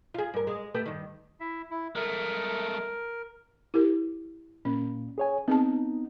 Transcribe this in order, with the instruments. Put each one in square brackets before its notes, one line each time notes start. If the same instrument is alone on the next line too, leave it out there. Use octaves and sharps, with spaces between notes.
[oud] F4 G#4
G2 A#4
G#3
A3 G4 B4
G2 D#3
[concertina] E4 E5
E4
[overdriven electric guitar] G#3 A3 [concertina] A#4
[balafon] E4 G4 A#4
[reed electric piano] A#2 [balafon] C#4
[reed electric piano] G#4 C#5 G#5
[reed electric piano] B3 D#4 [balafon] C4 G#4 A5